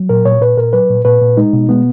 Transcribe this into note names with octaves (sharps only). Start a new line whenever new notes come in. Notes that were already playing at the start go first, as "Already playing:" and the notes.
Already playing: F#3
A#2 A#4
A#2 C#5
A#2 B4
A#2 A#4
F#3 B4
A#2
A#2 B4
A#2
G#3 D#4
B2
G#3 B3